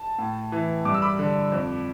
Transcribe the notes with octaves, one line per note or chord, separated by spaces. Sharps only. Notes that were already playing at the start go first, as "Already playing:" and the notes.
Already playing: A5
A2
E3
G2 D6
E6
B5 D6
D3
F2